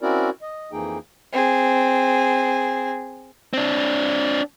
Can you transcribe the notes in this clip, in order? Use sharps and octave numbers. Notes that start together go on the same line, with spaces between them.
C4 C#4 E4 F#4 A#4 D5
D#5
F2 E3 A#3 D#4 G#4 G5
C4 G#4
C4 D4